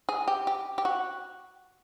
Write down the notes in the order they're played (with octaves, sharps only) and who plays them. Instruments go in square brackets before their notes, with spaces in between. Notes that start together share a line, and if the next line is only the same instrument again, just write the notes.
[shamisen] G#4
G4
G4
G4
F#4